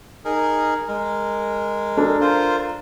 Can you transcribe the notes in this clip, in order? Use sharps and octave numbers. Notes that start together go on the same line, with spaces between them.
D#4 G#4 A#4
G#3 A#4
D4 A4
F4 A#4 C5